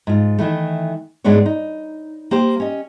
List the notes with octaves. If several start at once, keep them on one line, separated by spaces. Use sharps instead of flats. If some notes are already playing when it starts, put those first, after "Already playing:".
G#2 F4
D#3 E3 A3
G#2 G#3 B3 D4 C#5
D#4
A#3 G4 C5
C#4 D#5